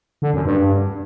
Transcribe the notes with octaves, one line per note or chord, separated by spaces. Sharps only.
D3
F#2
G2